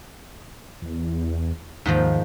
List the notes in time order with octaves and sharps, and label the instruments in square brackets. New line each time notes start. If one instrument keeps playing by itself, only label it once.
[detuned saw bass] E2
[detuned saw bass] D#2 [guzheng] G#2 D#3 F3